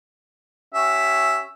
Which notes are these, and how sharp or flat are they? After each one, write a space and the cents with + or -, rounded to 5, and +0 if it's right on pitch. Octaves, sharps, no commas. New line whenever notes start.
C#4 +0 G4 -40 E5 +0